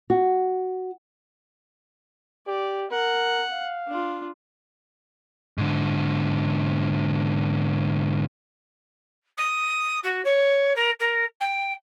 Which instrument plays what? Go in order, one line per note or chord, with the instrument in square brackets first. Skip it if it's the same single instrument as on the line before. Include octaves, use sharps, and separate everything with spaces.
[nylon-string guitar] F#4
[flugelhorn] G4 [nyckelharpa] D5
[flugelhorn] A#4 [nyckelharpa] F#5
[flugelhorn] F5
[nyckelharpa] D4 F4
[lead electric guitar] G#2 D3
[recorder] D#6
F#4
C#5
A#4
A#4
G5